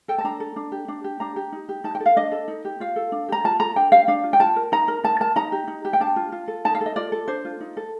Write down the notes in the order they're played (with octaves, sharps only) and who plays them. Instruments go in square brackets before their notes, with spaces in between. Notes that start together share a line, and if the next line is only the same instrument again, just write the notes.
[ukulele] A4 G5
A5
D4 A#5
A4
D4
G4
D4
G4
D4 A#5
G4
D#4
G4
D#4 A5
G5
A4
F5
D4 D#5
A4
D#4
G4
F4 F5
A4
D4
G4 A#5
F4 A5
A4 A#5
D4 G5
G4 F5
D4 F5
F4
G5
F4 A5
A#4
D#4 A#5
A#4
D#4 A5
A#4 A5
D#4 A#5
G4
D#4
G4
G5
D4 A5
F4
F4
A4
D#4 A5
F5
A4
D#5
F4 D5
A4
D4 C5
F4
D#4
A4